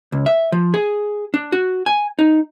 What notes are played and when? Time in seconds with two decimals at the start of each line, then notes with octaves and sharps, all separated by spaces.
0.12 C#2
0.26 E5
0.52 F3
0.74 G#4
1.34 D4
1.52 F#4
1.86 G#5
2.19 D#4